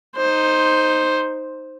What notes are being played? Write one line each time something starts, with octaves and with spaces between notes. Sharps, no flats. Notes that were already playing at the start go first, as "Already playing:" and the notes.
D#4 C5